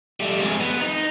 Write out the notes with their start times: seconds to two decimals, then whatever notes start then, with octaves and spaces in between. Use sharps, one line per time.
0.20 G3 A3
0.40 F2 G#3
0.60 B3
0.81 D#4